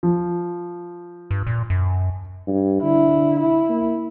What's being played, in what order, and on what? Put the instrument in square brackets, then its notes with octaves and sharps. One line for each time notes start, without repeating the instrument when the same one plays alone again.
[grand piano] F3
[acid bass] G2
A#2
F#2
[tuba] G2
[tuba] D3 [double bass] E4
[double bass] E4
[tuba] A#3